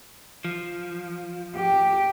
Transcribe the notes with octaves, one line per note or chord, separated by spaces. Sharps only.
F3
G4